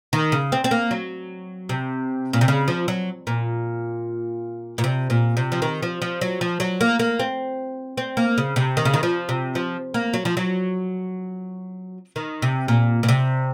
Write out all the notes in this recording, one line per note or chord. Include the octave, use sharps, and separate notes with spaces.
D#3
C#3
C4
C4
A#3
F#3
C3
A#2
C3
C#3
F3
F#3
A#2
A#2
C3
A#2
C3
F3
D#3
F3
F3
F#3
F3
F#3
A#3
A#3
C4
C4
A#3
C#3
C3
D#3
C#3
D#3
F3
C3
F3
A#3
F#3
F3
F#3
D#3
C3
A#2
A#2
C3